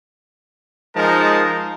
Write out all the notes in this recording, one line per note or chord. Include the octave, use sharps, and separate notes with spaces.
F3 G#3 D#4 A#4 A5